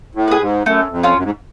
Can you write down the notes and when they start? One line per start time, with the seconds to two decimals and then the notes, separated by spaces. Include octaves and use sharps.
0.15 A2
0.28 G#4 B4
0.40 G#2
0.65 F#2 A3
0.91 F2
1.03 C#4 F4
1.16 F#2
1.23 G#2